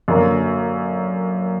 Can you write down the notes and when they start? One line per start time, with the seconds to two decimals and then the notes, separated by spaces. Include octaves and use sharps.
0.08 F#2 D3 F#3 A#3